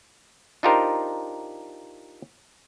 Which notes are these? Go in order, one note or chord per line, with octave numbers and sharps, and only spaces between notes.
D4 D#4 F4 G4 A#4 C5